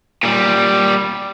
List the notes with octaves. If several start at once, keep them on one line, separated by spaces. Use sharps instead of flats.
A#2 G3